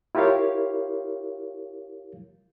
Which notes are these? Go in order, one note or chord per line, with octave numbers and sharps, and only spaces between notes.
E4 F4 G4 A#4 C#5 F5